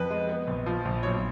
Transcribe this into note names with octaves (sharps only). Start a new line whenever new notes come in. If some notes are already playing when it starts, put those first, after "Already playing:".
Already playing: F2 B4
G#3
B3
A#1
F3
A#1
B1 C#5